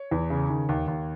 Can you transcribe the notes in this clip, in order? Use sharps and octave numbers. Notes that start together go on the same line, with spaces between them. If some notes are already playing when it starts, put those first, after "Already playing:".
Already playing: C#5
E2
C#3
D#3
D#2
D#2